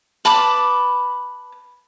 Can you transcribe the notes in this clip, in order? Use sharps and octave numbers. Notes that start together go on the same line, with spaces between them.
B4 A5 B5 D6